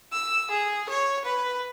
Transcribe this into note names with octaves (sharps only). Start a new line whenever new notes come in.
E6
G#4
C#5
B4